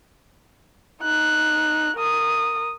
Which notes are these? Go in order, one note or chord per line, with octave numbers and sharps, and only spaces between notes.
D#4 F#6
A#4 D#6